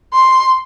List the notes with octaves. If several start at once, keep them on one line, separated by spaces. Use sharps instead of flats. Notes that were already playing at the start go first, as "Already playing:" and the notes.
C6